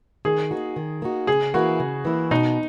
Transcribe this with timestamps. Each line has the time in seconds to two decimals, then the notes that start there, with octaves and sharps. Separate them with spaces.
0.25 D#3 G#4
0.51 A#3 D#4 F#4
0.76 D#3
1.02 A#3 D#4 F#4
1.27 C#3 G#4
1.54 E3 A#3 E4 F#4
1.80 C#3
2.05 E3 A#3 E4
2.31 B2 D#4